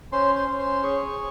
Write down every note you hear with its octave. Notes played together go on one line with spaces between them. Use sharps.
C#4 C5 C6
C5 C6
C#4
C5 C6
G#4 C#5 C#6